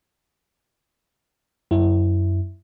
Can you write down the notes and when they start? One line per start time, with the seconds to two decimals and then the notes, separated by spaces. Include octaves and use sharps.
1.71 F#2 E4